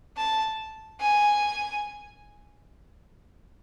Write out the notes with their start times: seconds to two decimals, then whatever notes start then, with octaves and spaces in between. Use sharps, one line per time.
0.17 A5
1.00 G#5